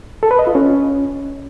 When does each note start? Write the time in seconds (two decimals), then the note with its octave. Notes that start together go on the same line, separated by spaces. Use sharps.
0.23 A4
0.31 B4
0.39 D#5
0.47 F4
0.55 C#4